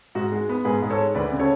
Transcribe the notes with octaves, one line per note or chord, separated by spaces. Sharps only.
G#2 F#4
G#3
B3
G#2 G#4 B4
G#2
A4 C#5
G#3
D2 B4 D5
C#3
A4 C#5